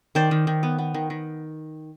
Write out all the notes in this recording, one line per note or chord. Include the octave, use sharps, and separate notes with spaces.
D#3 C5 D5
D#3
D#3
B3
B3
D#3
D#3